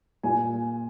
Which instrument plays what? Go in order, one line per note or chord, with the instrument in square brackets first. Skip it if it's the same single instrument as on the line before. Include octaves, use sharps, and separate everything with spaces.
[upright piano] A#2 G#5